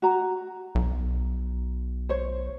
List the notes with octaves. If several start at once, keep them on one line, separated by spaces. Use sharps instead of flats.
F#4 A#5
B1
C5 C#5